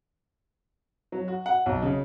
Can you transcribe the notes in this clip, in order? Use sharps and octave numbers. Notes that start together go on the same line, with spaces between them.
F#3
F#4
F#5
B1
C#3